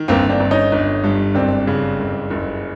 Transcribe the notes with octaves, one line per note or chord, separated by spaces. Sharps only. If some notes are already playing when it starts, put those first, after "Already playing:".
Already playing: D#3
G1 A#3 C4
C4 D4
G1
C#4 D#4
G1
G2
F#1 C4 D4
C#3
F#1
F#1